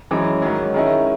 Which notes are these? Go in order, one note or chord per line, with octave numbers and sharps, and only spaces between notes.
F#2 E3 G#3 C#4
G#2 D#3 F#3
D#3 G#3 C#4 E4